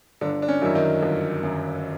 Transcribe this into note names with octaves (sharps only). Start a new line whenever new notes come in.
G1 D3 D4
D4
C#4
F#2 D#3 F#3 E4
D#3 D#4
G1
F#2 D#3 F#3